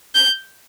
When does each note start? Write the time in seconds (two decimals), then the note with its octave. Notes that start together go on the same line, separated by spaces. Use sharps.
0.15 G6